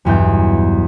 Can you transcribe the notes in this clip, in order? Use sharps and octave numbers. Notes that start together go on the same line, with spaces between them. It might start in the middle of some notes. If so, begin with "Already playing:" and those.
B1 E2 G2 G6